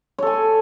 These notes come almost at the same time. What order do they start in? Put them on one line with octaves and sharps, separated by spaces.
C#5 A4 G#5